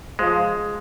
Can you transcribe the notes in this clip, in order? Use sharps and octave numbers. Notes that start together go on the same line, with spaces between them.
F3 G#3